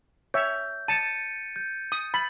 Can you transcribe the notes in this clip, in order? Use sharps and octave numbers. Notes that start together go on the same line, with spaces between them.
C#5 E5 G6
A5 A6 C#7 D#7
G6
D#6
B5 A6